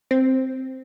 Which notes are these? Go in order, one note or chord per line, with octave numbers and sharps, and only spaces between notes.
C4